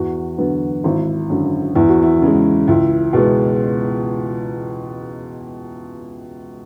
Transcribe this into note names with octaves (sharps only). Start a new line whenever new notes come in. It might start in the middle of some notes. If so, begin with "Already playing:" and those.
Already playing: E2 F#4
D3 F#3 B3
G#1 E4
F#2 D3
E2 E4
F#4
E4
C#3 G#3
C#2 E4
B2 G#3 B3